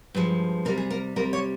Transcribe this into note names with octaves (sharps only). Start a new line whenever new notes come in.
G2 F3 G#3
C3 G3 A#4
G#4
A#4
C3 G3 A#4
C#5